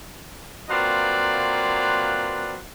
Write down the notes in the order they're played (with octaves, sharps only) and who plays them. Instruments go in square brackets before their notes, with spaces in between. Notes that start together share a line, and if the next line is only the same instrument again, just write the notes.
[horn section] F#3 A#3 C4 F4 B4 D5